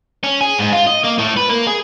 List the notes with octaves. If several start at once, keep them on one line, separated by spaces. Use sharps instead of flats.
C#4
G#4
G#2
F4
D#5
A#3
A2
B4
A#3
G#4